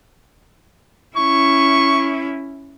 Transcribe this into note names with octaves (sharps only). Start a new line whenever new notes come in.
C#4 E4 C#6